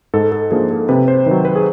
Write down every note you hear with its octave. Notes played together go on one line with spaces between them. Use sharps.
G#2 A4
A4
F3 A#3 D4 G#4
A4
C3 B4
C5
D#3 F#3 B4
B4
G#4